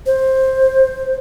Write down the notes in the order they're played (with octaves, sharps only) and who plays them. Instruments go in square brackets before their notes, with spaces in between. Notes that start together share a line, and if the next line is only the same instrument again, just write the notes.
[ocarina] C5